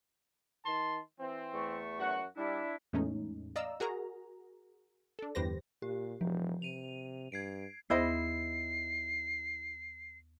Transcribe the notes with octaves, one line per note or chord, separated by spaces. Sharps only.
D#3 A5 C6
E3 C4
E2 A3 C#6
F#2 F#4 F#5
G3 D4 E4
E2 A2 G#3 A3 C#4 D#4
D5 D#5 F5 A#5 E6
F#4 G#4 A#4 A#5
D4 A4
G1 E2 G4 B4 C5 A#6
A#2 G4
E1 F3
C3 D#7 F7
G2 G#6 C7 D7
D#2 B3 E4 G#4 C5 D#5 C7